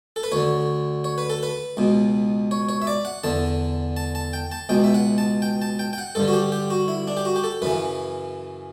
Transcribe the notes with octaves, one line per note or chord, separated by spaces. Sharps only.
A4
B4
D2 D3 C#5
C#5
B4
A4
B4
C#2 B2
C#5
C#5
E5
D5
F#5
E2 D3 A5
A5
A5
G5
A5
C#2 B2 G5
E5
F#5
A5
G5
A5
G5
G5
F#5
G2 D3 A4
F#4
G4
G4
F#4
E4
D4
G4
F#4
G4
A4
F#2 C#3 E3 B4